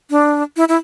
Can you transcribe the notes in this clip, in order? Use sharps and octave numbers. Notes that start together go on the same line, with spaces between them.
D4
E4
E4